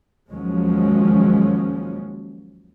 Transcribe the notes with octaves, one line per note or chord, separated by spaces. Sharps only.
D#2 F3 F#3 G#3 C#4